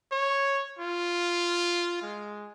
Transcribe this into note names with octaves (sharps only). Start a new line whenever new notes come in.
C#5
F4
G#3